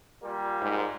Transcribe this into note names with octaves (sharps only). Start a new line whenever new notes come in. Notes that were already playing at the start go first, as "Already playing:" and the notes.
A#2 G3 A#3
G#2